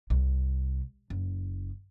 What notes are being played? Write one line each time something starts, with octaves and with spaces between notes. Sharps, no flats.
C2
F#1